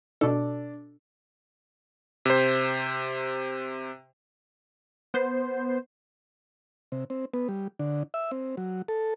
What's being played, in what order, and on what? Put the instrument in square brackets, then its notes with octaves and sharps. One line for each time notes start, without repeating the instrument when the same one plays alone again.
[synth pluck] B2 A4 [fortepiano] D4
[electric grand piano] C3 C5
[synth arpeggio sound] B3 C5
[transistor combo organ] C3
C4
B3
G3
D3
E5
C4
F#3
A4